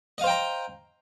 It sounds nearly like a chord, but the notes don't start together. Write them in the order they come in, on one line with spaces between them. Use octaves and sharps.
D#5 F5 C5 G5 A#5